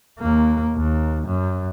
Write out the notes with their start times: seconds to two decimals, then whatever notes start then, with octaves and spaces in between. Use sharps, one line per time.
0.19 D#2 A#3
0.76 D#2
1.27 F#2